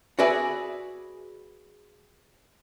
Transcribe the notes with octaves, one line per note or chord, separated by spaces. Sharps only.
F#4 G#4 B4 D5 E5 G#5